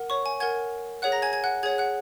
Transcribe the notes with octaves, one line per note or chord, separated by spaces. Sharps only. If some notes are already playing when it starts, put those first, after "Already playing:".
Already playing: A#4 F#5
C#5 C#6
G#5
A#4 F#5 G#5 G#6
G#4 C#5 F#5 F#6
A#5 A#6
G#5 G#6
G#5 G#6
F#5 F#6
G#4 C#5 F#5 G#5 G#6
F#5 F#6